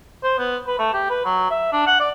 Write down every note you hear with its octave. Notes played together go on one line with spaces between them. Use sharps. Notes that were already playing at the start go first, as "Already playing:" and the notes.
C5
B3
B4
A3
G4
B4
F#3
E5
D4
F#5
D5